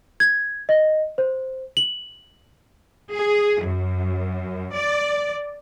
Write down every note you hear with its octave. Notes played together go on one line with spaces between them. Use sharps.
G#6
D#5
C5
F#7
G#4
F#2
D5